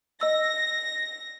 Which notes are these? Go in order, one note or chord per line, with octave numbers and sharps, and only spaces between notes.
D#5 E6 A#6